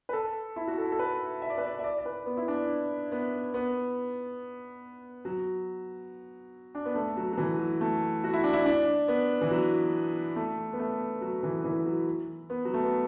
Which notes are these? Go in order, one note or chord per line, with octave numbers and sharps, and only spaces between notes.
B4
A4
E4
F#4
A4
A4
B4
E5
D5
B4
D5
E5
D5
D5
B4
B3
E4
D4
B3
B3
F#3
D4
B3
A3
F#3
F#3
E3
F#3
A3
F#4
E4
D4
E4
D4
B3
E3
F#3
A3
B3
A3
F#3
E3
E3
F#3
B3
F#3
A3
B3